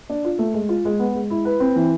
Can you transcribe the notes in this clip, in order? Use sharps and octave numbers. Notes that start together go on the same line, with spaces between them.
D4
F4
A3
G#3
F4
G#3
B3
G#3
E4
B4
C4
E3